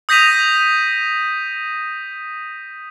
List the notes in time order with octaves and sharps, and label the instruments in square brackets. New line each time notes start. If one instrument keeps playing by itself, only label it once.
[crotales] D#6 G6 A#6 B6 D#7 F7